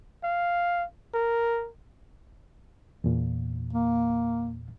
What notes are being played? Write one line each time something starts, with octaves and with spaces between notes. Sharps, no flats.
F5
A#4
E2 A#2
A#3